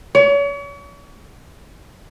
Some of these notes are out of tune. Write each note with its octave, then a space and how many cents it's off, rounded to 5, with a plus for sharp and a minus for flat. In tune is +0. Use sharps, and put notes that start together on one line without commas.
C#5 +40